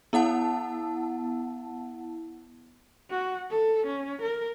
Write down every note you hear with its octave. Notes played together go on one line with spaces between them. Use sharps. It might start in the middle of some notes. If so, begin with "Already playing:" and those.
B3 E4 F#5 A5
F#4
A4
C#4
A#4